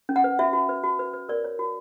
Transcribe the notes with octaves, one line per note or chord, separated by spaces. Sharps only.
C#4
F#5
B4
F#4 E5
F#4
B4
F#4
B4
B4
A#4 D5
C#5
F#4